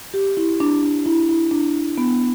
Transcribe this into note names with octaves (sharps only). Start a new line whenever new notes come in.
G4
E4
D4
D4
E4
E4
D4
B3